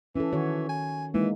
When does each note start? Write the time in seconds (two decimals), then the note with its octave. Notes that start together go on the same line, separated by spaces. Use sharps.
0.16 E3 C#4 A4
0.33 D#3 F#4 C#5
0.69 G#5
1.14 E3 G#3 A#3 D#4